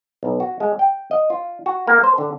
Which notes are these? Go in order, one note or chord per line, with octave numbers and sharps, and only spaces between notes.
B1
F#4
G#3
G5
D#5
F4
F#4
A#3
C5
D3